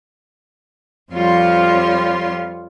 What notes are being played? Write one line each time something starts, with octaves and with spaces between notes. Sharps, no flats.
F2 F3 G3 F4 C#5 C6